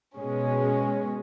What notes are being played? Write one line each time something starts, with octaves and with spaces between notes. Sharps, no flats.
B2 G#3 C#4